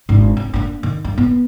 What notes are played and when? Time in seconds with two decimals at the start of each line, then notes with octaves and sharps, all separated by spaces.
0.09 G#1 D4
0.37 C#4
0.54 A#3 D4
0.83 D#3
1.04 G2
1.18 B3